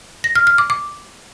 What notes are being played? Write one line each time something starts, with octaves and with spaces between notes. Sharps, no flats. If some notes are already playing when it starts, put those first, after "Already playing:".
A#6
F6
F6
D6
D6